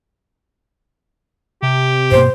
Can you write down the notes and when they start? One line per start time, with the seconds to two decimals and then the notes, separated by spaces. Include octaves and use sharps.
1.62 C3 G4
2.11 G2 B2 A#3 C5